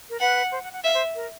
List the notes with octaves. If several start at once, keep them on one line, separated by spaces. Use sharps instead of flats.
A#4
B4 F#5
C5
F#5
F#5
E5 F5
C5
A#4